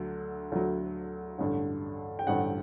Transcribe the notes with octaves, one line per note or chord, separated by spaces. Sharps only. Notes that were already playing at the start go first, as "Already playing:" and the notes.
Already playing: D2 D3 F#3
D2 D3 F#3
A1 G2 D3
G5
A1 G2 D3 F#5